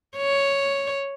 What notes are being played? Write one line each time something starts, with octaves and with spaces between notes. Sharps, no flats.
C#5